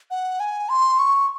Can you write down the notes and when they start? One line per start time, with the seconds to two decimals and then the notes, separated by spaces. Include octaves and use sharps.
0.11 F#5
0.40 G#5
0.69 C6
0.99 C#6